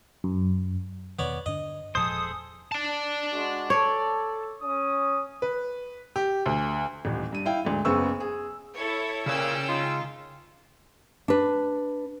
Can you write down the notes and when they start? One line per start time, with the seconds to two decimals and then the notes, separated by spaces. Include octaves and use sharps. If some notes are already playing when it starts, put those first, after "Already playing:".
0.24 F#2
1.19 E2 B2 D#3 B3 C#5 D5
1.46 G2 D3 D4 D#5
1.95 E1 A#2 F3 G#4 A4 C5 D#6
2.72 D5 A5
3.32 G#3 F#4
3.70 A4 C#5
4.60 C#4 D#6
5.42 B4
6.16 G4
6.46 D2
7.05 D#1 A1
7.33 G2 D#7
7.45 E4 F5 G5
7.65 D2 G#2
7.85 F#1 C#3 B3 C5 C#6 E6
8.20 G#4
8.76 E4 A4 C#5
9.26 A#2 C#3 C#5 G5 E6
9.69 G#3 D#4 F4
11.28 D4 B4